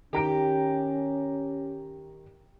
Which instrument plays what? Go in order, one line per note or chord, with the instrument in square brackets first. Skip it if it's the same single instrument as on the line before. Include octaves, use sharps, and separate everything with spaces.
[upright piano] D#3 A#5 D7 [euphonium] C#4 [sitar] G4